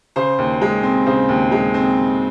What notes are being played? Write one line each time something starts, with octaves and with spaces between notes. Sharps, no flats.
C#3 C5
D#2
G#3
C4
C#3 C5
D#2
G#3
C4